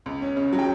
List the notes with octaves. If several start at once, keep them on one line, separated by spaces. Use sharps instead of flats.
C#2
C#4
C#3
F#3
G5